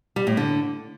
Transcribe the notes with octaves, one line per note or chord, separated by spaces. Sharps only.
G3
A2
D3